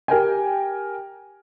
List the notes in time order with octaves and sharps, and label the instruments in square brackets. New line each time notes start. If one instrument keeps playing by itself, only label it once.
[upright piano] G4 A#4 G5 G#5